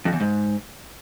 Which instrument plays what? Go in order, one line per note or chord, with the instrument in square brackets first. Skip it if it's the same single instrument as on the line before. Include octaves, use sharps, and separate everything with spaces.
[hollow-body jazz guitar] F2
E2
G#2